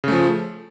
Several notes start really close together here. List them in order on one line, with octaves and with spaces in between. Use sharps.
C#3 A3 F3